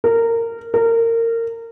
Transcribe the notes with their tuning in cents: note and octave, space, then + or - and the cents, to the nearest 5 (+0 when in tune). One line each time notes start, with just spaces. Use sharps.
A#4 -20
A#4 -25